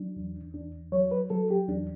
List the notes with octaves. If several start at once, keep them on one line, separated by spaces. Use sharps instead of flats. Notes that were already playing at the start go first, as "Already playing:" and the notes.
Already playing: F#3 D4
E2
E2 D4
F#3 C#5
B4
F#3 A4
G4
E2 D4